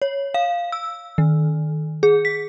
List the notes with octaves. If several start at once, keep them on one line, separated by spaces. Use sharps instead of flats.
C#5
F5
E6
D#3
G#4
B6